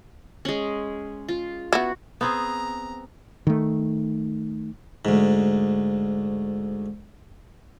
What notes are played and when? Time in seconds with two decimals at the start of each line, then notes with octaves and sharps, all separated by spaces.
0.45 G#3 C#4
1.28 F4
1.73 B3 E4 F#4
2.21 B3 C4 G#4 A#5
3.47 D#3 A3
5.05 D2 G#2